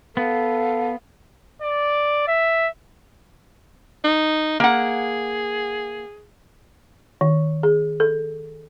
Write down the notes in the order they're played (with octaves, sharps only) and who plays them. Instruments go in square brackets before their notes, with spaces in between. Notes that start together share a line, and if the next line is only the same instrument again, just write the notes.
[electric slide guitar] B3 [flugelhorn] A4 [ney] F5
[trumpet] D5
E5
[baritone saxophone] D#4
[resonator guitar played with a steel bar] A#3 F#5 [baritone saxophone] G#4
[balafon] D#3
G#4
A4